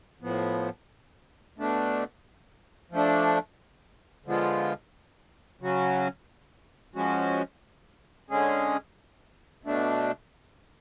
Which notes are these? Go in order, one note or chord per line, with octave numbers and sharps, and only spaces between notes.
A2 F3 B3
B2 A3 D4
F3 A3 D4
D3 F3 G#3 B3 F4
C#3 F#3 C#4 F#4
F3 G#3 C#4 F#4
D3 G#3 C#4 G#4
B2 A3 D4